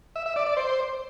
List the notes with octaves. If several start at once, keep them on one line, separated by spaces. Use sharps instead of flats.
E5
E5
D5
D5
C5